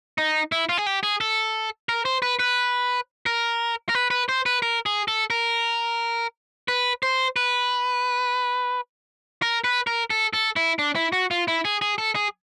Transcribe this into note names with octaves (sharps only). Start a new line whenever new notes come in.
D#4
E4
F4
G#4
G4
G#4
A4
A#4
C5
B4
B4
A#4
A#4
B4
B4
C5
B4
A#4
G#4
A4
A#4
B4
C5
B4
A#4
B4
A#4
A4
A4
E4
D4
E4
F#4
F4
E4
G#4
G#4
A4
G#4